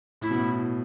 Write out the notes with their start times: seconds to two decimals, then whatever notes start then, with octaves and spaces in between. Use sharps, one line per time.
0.21 A2 E4
0.31 B2
0.38 A2